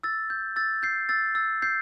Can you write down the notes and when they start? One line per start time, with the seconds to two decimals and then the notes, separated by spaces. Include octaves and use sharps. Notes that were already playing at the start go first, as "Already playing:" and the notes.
0.03 E6 A6
0.30 G6
0.56 E6 A6
0.83 G6 C7
1.09 E6 A6
1.35 E6 A6
1.62 G6 C7